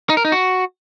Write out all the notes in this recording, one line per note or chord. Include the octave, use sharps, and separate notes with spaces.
D#4
A#4
D#4
F#4